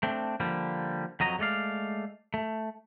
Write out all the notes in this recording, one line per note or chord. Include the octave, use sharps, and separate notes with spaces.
A3 C4 D4
D3 F3 G3 A#3
F2 F#3 D#5 A#5
G#3 A3 D5 F5
A3